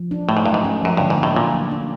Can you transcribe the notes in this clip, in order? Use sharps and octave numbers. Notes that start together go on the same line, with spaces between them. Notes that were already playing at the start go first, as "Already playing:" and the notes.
Already playing: F3
D4
A2 A3
G#2
G2 F#3
G#2
C#4
F#2 F3
G2 D3
G#2
A#3
A2
A#2 A#3
F#3
D4